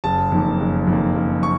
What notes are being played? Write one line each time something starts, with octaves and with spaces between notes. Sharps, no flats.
F#1 A5
F2 D#3 A#3
F#1
F2 D#3 A#3
F#1
C#6